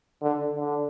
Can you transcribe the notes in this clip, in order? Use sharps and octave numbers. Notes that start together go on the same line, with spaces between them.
D3
D3